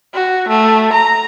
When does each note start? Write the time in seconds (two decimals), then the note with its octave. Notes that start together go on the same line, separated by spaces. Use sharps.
0.14 F#4
0.48 A3
0.93 A#5